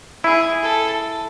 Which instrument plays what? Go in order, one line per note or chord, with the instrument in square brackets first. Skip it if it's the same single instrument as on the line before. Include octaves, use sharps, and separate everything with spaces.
[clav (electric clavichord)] E4 [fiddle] G#4
[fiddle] A4